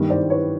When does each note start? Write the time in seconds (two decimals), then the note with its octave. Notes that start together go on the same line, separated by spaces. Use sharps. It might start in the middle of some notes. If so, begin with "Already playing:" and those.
Already playing: G2 D#3 G3
0.10 C5 D5
0.30 B4 C#5